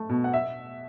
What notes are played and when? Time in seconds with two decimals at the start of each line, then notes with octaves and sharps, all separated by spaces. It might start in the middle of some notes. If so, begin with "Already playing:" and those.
Already playing: A3
0.09 B2
0.24 F#5
0.34 E5